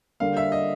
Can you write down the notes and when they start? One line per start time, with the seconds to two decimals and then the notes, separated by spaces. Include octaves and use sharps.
0.20 D3 G3 A#3 F5
0.37 E5
0.52 D#5